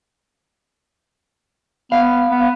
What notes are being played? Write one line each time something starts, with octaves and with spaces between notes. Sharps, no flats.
B3 F5
B3